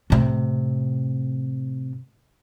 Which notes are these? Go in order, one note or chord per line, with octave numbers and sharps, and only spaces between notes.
A2 C3